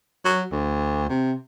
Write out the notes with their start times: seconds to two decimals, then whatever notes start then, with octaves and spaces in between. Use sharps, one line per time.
0.25 F#3
0.52 D2
1.09 C3